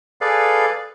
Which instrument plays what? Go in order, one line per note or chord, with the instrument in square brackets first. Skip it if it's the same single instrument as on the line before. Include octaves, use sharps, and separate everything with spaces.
[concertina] G#4 A4 B4 D5 F5